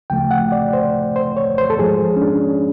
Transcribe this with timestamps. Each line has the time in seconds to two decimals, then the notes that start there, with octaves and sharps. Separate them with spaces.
0.10 D2 C#3 F3 A3 G5
0.31 F#5
0.52 D5
0.73 C5
1.16 C5
1.37 C#5
1.58 C5
1.70 A4
1.79 G#2 F3 G#3 G#4
2.16 C#4
2.22 D4